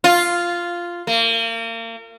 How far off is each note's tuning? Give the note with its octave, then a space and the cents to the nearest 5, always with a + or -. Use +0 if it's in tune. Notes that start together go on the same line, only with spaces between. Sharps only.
F4 -5
A#3 -35